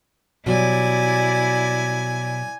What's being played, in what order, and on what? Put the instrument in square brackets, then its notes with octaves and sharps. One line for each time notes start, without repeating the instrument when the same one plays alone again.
[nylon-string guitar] B2 F#3 G3 [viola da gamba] E4 D5 [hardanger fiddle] G#5